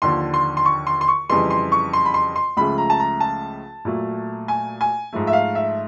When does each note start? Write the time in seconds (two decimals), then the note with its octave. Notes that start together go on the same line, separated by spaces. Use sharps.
0.02 D#2 D3 F3 C6
0.34 C6
0.57 C6
0.65 C#6
0.87 C6
1.01 C6
1.08 C#6
1.29 F2 C#3 E3 G3 C6
1.50 C6
1.72 C#6
1.93 C6
2.05 B5
2.14 C6
2.36 C6
2.57 C#2 C#3 F3 A3 B5
2.78 A#5
2.90 A5
3.00 A#5
3.20 A5
3.85 A#2 F#3 A3
4.48 G#5
4.81 G#5
5.13 G#2 F3 A3
5.27 E5
5.33 F5
5.55 E5